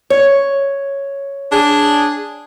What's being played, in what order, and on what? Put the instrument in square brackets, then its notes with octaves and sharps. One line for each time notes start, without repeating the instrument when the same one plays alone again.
[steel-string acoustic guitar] C#5
[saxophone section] D4 G#4